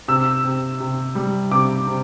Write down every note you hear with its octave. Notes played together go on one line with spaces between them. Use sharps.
C3 E6
C3
C3
G3
C3 D6
C3